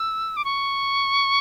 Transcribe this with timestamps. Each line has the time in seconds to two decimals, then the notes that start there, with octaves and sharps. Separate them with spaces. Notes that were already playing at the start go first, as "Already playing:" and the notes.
Already playing: E6
0.37 D6
0.45 C#6